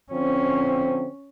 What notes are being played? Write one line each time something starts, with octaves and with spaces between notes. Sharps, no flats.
D3 F3 C4 C#4